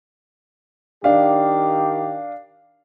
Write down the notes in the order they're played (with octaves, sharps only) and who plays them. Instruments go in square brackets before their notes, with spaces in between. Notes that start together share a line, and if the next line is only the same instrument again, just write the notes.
[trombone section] D#3 G4 [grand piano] D4 F5